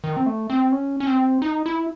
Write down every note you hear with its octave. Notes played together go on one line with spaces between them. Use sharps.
D#3
C4
A3
C4
C#4
C#4
C4
D#4
E4